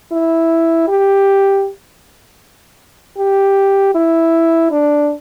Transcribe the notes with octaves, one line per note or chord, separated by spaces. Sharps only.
E4
G4
G4
E4
D4